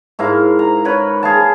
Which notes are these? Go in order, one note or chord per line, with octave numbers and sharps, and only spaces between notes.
G#2 E4 A#4 F5
A#5
A#4 B4 C#5 B5
G#4 F5 A5
G#4